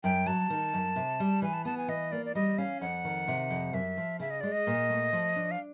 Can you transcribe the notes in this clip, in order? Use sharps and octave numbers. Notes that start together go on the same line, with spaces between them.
F#2 G5
F#3 A5
D#3
F#2
C3
G3
E3 G#5
A5
B3 A5
G#5
E3 D#5
A#3 D5
D5
G3 D#5
C#4 F5
F2 F#5
D#3
C3
F2
F#2 E5
F3
C#3 E5
D#5
G#3 D5
D#5
A#2
A3
F3
D4
F5